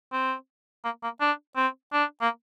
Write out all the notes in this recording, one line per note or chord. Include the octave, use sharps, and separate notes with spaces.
C4
A#3
A#3
D4
C4
D4
A#3